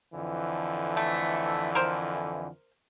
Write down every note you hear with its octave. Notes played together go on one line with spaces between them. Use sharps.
F2 D3 E3
A3
A#4 C5